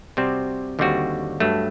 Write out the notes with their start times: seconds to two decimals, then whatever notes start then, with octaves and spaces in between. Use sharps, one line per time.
0.17 C3 G3 C4 F#4 C5
0.79 D#2 D3 G3 C4 F#4
1.40 G2 F#3 A3